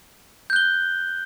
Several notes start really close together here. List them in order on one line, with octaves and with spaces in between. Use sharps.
G6 F#6 G7